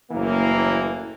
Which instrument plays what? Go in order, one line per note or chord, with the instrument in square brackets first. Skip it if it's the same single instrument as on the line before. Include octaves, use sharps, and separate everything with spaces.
[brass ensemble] F#1 A2 E3 A#3